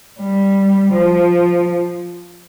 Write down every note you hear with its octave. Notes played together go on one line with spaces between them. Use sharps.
G3
F3